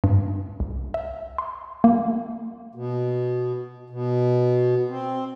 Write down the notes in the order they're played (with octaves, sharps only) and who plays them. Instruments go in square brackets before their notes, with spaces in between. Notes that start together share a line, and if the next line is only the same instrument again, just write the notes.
[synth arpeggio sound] G2
C2
E5
C6
A#3
[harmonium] B2
B2
C4